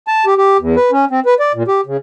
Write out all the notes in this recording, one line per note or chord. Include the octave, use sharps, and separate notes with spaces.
A5
G4
G4
E2
B4
C#4
C4
B4
D5
A#2
G4
C#3